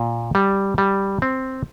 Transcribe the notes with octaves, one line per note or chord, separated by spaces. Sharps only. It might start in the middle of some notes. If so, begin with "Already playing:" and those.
Already playing: A#2
G3
G3
C4